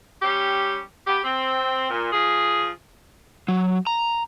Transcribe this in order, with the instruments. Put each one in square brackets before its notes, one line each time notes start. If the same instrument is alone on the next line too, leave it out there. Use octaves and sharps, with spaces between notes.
[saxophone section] G3 C#4 G4
B3 G4
C4
A#2
F3 G#4
[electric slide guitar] F#3
A#5